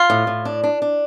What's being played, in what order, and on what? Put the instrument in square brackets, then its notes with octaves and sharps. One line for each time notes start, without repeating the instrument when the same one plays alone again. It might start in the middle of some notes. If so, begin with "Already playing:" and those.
Already playing: [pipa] F4
[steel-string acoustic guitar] A2
A2
D4
D4
D4